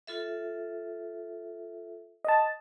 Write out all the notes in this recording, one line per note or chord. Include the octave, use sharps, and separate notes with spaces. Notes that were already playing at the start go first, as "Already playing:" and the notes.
F4 A4 E5
D#5 A5